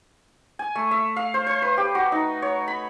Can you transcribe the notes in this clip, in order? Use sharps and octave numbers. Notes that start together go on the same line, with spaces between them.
G#5
A3
E5
F5
C5
C5
B4
G4
F#4
D#4
C#5
B5